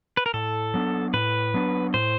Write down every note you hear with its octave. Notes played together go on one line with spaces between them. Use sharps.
B4
A#4
A2 A4
F#3 B3 D4
A2 B4
F#3 B3 D4
A2 C5